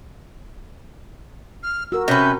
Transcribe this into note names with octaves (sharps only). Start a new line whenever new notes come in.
F6
F#4 A#4 E6
C3 C#4 B4 G6